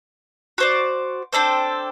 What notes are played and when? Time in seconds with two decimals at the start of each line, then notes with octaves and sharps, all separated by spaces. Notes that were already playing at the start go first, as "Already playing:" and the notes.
0.58 F#4 C5 D5
1.32 C4 D4 A4 C5